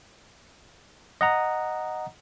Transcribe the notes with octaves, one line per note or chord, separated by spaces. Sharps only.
D#5 F#5 A#5